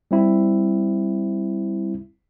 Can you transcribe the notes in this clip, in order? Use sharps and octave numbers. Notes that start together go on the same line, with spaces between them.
G3 C4 E4